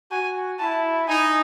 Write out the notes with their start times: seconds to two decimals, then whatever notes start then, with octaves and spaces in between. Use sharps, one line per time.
0.12 F#4 G#5
0.59 E4 A5
1.08 D#4 G#5